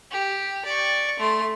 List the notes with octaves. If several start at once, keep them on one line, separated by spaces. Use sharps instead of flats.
G4
D5 C#6
A3 C6